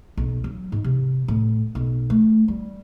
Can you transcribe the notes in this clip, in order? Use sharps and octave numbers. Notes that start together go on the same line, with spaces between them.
B1
F#3
G#2
C3
A2
B1
A3
G3